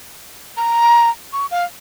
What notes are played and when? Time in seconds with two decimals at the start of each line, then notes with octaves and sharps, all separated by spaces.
0.57 A#5
1.33 C#6
1.51 F5